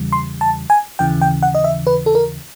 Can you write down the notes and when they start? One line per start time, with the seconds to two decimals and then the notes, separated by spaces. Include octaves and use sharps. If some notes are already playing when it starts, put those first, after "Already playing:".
Already playing: E2 C#3 E3 G3
0.12 C6
0.41 A5
0.70 G#5
0.99 D#2 C#3 E3 G5
1.21 G5
1.43 F#5
1.55 D#5
1.64 E5
1.87 B4
2.06 A4
2.15 A#4